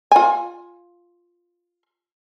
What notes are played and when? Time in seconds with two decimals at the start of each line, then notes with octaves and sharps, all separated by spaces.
0.12 F4 G#5